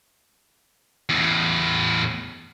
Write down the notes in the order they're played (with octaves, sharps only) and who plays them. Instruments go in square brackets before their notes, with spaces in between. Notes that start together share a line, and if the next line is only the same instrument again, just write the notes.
[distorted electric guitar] E2 A2